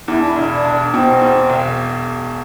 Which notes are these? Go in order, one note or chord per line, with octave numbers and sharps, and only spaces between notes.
E2 E4
D4
E4
E1
D4
E1
B2 C4
E2
E1